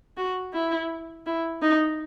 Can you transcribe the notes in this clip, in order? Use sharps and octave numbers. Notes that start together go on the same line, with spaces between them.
F#4
E4
E4
D#4